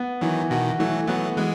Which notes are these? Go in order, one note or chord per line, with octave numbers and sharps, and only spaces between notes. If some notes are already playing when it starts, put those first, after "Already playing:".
Already playing: B3
D#3 E3 F#3
B2 D#3 F#4
E3 F#3 A3
F#3 A3 B3
E3 G#3 B3